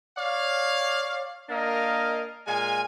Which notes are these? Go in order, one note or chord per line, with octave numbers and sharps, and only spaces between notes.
C#5 D5 F5
A#3 D4 A#4 D#5 F5
A#2 G#3 F5 G#5